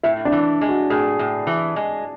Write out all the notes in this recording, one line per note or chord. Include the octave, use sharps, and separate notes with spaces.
A2 E4
D4
E3
G#3
F#4
A2 G#4
A2
E3
G#3